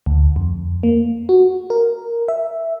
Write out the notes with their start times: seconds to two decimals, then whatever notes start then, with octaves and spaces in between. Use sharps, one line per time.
0.06 D2
0.36 F2
0.83 A#3
1.29 F#4
1.70 A#4
2.28 E5